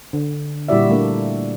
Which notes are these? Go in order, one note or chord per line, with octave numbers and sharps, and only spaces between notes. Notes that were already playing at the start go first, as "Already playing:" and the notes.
D3
A#2 G3 E4 F#4 D5 E5
A3 A#3 D4